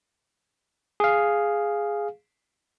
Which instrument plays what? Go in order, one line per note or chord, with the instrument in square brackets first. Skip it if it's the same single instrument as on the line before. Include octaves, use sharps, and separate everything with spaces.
[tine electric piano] G#4 F5